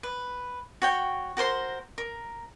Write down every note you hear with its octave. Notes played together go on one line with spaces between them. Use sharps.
B4
F#4 C#5 G5
F#4 A#4 C5 C6
A#4